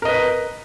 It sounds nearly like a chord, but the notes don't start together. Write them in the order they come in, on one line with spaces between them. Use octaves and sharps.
A#4 D#5 B4